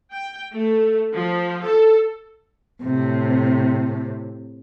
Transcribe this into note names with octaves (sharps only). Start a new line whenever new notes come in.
G5
A3
F3
A4
A2 C3